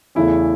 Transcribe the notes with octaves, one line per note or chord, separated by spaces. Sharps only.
E2 C#3 E3 A3 E4